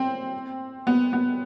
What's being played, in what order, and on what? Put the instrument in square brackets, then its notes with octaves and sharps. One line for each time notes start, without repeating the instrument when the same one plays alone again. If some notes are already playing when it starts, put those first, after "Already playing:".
Already playing: [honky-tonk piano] C4
B3
B3